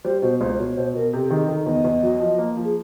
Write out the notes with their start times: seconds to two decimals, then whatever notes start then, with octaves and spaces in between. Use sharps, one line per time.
0.05 G3 C5
0.22 B2 C5
0.41 C#2 C5
0.54 C5
0.59 B2 C#5
0.71 C#5
0.77 B2 C5
0.94 B2 A#4
1.13 C3 A4
1.30 D#3 G#4
1.48 D#3 A4
1.66 E2 D#5
1.84 E2
2.03 F#3
2.20 F3
2.38 A#3
2.57 F3
2.64 G#4